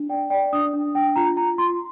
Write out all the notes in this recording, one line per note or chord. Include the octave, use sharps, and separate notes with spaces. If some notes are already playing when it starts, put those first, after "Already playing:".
Already playing: D4
D5 G5
D5 G5
D4 D#6
D4
D4 G5
F4 A#5
F4 A#5
F4 C6